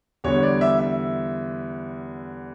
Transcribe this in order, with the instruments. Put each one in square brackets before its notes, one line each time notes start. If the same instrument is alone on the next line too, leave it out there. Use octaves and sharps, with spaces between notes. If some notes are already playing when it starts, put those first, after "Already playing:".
[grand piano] E2 D3 G3 C#5
D5
E5
E5